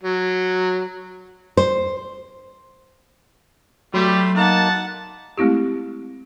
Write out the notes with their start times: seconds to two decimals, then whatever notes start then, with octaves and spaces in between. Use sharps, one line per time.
0.03 F#3
1.57 C5
3.94 F#3 G3 A3 G4 B5 C6
4.36 A#3 D#4 F#5 A5
5.38 G#3 A3 C4 E4 G4